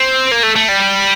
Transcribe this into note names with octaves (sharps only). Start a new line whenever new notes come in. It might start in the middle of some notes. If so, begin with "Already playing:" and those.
Already playing: C4
A#3
A3
A3
G3